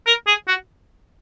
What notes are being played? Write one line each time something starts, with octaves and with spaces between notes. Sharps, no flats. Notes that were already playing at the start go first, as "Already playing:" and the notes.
A#4
G#4
F#4